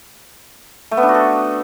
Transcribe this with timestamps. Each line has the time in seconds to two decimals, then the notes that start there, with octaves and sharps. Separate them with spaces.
0.91 A3
0.97 B3
1.03 D4
1.09 F#4
1.14 A4